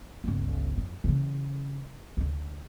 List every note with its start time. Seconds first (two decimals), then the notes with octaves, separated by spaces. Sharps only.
0.24 G1 C#2
0.78 F2
1.04 C#3 E3
2.17 D2 D3